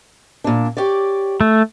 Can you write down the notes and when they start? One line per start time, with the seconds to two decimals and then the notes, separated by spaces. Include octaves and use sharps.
0.44 A#2 D4
0.77 G4 C#5 D5
1.41 A3